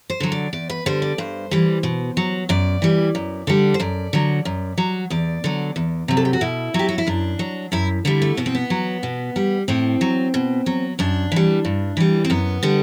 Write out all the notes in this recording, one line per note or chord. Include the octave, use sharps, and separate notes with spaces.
C5
D3 F#3
D5
E2 D5
B4
D3 G3 C5
D5
G2 C5
E3 G3
B2
F#3
F#2 D5
E3 G3
F#2
D3 G3
C5
F#2 D5
D3 F#3
F#2
F#3
E2 D5
D3 F#3
E2
C3 F#3
A4
G4
F#4
B2 E4
F#3 G4
F#4
E4
F#2 D4
F#3
F#2 E4
D3 G3 E4
A3
B2 B3
C4
B3
F#3
B2
G3
A2 C4
F#3
B2
F#3
F#2 D4
E3 G3
G2
E3 G3
C4
F#2 B3
D3 G3